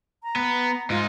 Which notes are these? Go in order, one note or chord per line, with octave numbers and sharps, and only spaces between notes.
A#5
B3
G#2 D#4 F4